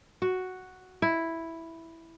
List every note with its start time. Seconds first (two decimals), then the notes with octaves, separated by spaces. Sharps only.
0.22 F#4
1.02 E4